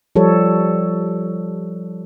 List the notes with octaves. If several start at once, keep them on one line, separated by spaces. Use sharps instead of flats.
F3 G3 A4 C#5